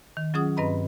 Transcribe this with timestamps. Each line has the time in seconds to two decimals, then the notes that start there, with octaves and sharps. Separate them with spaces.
0.17 D#3
0.34 F#3 C#4 F4 G#4 F#5 D#6
0.57 G2 C4 B4 D#5 A#5 B5